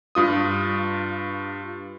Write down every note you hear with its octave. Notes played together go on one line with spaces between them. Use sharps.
G2 F4 D#6